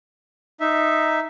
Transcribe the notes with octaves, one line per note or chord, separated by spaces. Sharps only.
D#4 E5